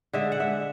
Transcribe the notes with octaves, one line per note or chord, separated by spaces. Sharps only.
D3 G#3 E5
F#5
E5